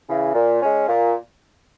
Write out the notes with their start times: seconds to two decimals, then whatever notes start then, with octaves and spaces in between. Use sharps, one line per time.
0.08 C#3 E3
0.34 A#2
0.61 G#3 C#4
0.88 A#2